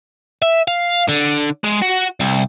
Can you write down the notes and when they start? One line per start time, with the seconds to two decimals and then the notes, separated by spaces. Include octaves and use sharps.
0.42 E5
0.68 F5
1.09 D3
1.64 G#3
1.82 F#4
2.20 C2